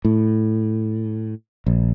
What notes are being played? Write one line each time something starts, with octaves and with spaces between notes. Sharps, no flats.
A2
A#1